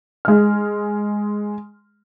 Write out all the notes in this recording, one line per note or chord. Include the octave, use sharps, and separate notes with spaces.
G#3 F6